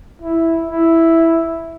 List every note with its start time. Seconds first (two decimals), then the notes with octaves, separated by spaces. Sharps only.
0.22 E4
0.71 E4